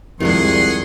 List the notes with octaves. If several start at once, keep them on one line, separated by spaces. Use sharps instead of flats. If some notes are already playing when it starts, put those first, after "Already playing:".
C2 F2 D#3 G#3 D4 G#4 F#5 C6